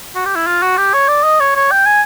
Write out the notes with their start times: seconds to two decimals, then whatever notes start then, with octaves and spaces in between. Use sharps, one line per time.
0.15 F#4
0.25 G4
0.36 E4
0.47 F4
0.62 F#4
0.77 G4
0.93 C#5
1.08 D5
1.23 D#5
1.40 C#5
1.55 C#5
1.71 G5
1.86 G#5